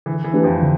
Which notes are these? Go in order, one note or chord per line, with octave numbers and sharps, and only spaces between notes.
D3 E3
E3
A3 D4 G4 B4
F2 F3
D3